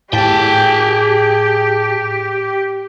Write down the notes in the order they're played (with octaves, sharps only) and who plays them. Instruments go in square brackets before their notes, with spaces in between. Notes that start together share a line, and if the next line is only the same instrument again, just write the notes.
[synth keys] A2 A5 B6 [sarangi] G4 [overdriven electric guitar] G#4 G5